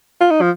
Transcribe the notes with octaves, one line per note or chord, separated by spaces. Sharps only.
F4
D#4
F3